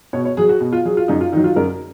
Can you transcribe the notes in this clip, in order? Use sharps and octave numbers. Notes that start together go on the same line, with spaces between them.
B2 C#5
C#5
F#3 G#4
F#4
B2
F4
F#3 G#4
F4
F#2 D#4
F4
D#3 F#3 D#4
F4
F#2 A#4